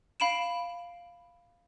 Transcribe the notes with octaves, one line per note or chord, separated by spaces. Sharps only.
F5 B5 D7 E7